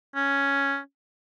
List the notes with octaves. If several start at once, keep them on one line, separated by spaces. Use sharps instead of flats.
C#4